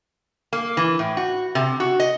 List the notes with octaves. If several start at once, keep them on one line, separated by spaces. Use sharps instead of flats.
A#3
E3
A2
F#4
C3
F#4
D#5